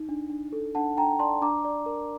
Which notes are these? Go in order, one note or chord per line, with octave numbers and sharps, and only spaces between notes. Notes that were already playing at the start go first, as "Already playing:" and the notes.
Already playing: D#4
D4
D4
A4
D4 F#5 A5
D4 G5 A#5
D5 A5 C6
D4 A#5 D6
D5
A#4